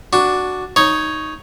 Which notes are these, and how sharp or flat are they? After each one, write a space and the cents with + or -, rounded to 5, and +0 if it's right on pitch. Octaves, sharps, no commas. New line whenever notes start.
D4 +0 F#4 +0
D#4 +0 C#5 +0